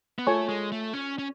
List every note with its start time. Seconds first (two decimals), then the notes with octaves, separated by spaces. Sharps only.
0.19 B3
0.27 A3 F4 A4 C#5 G#5 C#6
0.49 G#3
0.72 A3
0.94 C#4
1.18 C#4